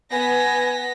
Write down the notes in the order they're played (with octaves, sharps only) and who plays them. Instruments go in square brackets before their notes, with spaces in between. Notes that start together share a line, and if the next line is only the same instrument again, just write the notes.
[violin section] B3 A#6 B6 [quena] G#5